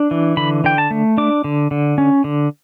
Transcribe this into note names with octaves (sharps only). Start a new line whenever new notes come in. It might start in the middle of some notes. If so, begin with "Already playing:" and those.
Already playing: D4
E3
D3 B5
D3 G5
A5
A3
D4 D6
D3
D3
C#4
D3